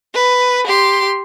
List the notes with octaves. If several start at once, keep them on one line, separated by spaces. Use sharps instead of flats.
B4
G4 C6